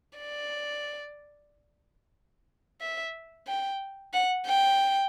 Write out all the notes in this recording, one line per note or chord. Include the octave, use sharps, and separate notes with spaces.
D5
E5
G5
F#5
G5